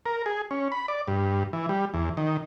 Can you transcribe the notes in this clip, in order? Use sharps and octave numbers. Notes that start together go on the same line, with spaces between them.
A#4
G#4
C#4
B5
D5
G2
E3
G3
E2
D#3